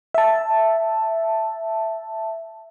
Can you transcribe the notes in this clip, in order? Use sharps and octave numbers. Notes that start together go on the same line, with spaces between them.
E5 A5